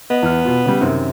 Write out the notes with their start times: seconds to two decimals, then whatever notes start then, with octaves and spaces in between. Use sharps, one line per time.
0.10 B3 D#5
0.23 E2 F6
0.45 B2 F4
0.66 C#3 G3
0.81 F#2 C3 D#3